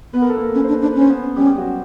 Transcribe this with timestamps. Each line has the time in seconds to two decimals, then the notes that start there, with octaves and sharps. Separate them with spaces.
0.13 B3 B4
0.22 A#4
0.29 A4
0.36 A#3 A#4
0.55 C#4 B4
0.64 D4 C5
0.74 B4
0.82 D4 C5
0.92 C#4 B4
1.01 C5
1.10 B3 B4
1.36 G3 C#4 G4
1.47 G4
1.57 F#3 F#4